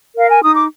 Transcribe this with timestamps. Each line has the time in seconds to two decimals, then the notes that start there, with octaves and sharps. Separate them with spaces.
0.16 A#4 F5
0.30 G#5
0.42 D#4 D#6
0.55 D6